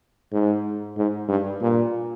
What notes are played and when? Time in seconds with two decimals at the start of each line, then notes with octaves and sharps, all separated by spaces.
0.33 G#2
0.98 G#2
1.28 G2
1.61 A#2